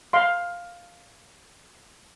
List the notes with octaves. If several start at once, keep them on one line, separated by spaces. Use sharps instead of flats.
F5 C6